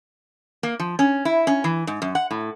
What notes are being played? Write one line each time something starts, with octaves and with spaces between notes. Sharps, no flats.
A#3
F3
C#4
E4
C#4
E3
G#2
F#2
F#5
A2